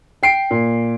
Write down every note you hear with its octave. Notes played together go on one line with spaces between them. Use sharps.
G5 C7 D7
A#2